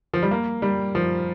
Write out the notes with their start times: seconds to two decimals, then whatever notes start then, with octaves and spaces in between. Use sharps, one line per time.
0.14 F3
0.23 G3
0.31 A#3
0.62 G3
0.95 F3